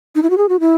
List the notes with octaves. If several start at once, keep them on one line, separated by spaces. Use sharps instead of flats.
D#4
E4
F#4
G#4
F#4
E4